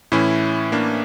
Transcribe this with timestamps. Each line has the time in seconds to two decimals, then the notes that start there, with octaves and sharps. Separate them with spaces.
0.12 A2 E3 C#4 E4
0.72 A#3 D4